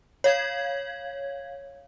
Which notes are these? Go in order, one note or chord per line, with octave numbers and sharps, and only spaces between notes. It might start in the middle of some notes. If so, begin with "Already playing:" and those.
C#5 F5 G#6